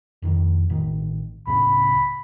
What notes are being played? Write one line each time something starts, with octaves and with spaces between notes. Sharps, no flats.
F1 F2 D#3
A1 D#3
C#2 A2 C#3 B5